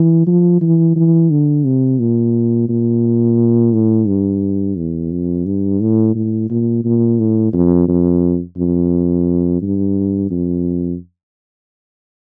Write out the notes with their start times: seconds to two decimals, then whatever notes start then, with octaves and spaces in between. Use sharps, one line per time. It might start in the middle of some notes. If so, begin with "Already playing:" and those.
Already playing: E3
0.27 F3
0.62 E3
0.97 E3
1.31 D3
1.65 C3
2.00 A#2
2.69 A#2
3.73 A2
4.08 G2
4.78 E2
5.12 F2
5.46 G2
5.81 A2
6.15 A2
6.50 A#2
6.85 A#2
7.20 A2
7.53 F2
7.89 F2
8.58 F2
9.62 G2
10.31 F2